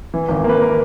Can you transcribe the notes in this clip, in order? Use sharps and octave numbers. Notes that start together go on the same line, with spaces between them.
E3
G#1
A#3 B4
A#4